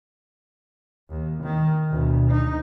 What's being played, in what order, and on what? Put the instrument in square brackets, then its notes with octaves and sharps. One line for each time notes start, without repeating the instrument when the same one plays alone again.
[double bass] D#2
D#3
D2 B2
D#4